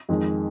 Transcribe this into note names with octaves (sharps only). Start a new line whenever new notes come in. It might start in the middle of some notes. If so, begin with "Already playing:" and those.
F2 D#3 G#3